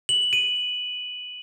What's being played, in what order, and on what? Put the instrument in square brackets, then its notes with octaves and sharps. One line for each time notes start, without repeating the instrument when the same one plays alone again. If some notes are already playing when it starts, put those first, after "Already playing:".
[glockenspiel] F#7
D#7